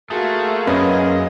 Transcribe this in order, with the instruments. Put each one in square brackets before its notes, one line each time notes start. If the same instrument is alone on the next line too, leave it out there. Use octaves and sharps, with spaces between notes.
[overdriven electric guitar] A3 [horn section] A#3 F4 G#4 [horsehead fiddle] F#4
[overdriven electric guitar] F#2 [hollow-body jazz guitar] C#4 B4 [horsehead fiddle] D#5